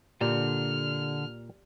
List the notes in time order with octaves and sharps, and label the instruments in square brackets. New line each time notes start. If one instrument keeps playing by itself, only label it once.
[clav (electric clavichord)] A#2 [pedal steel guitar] D3 [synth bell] G4 D5 [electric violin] F6